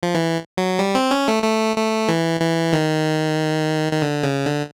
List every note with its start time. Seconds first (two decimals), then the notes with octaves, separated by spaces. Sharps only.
0.03 F3
0.15 E3
0.57 F#3
0.79 G3
0.95 C4
1.11 C#4
1.28 A3
1.43 A3
1.76 A3
2.09 E3
2.41 E3
2.73 D#3
3.92 D#3
4.02 D3
4.24 C#3
4.45 D3